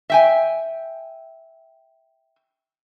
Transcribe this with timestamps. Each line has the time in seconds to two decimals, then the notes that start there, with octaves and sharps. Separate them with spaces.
0.10 E5 G5 G#5